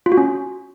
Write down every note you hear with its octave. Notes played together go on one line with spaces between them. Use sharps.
F4
F#4
C#4